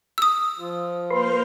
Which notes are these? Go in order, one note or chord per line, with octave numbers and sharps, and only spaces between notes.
D#6 E6
F3 F4
A#3 B4 C6 F6 G6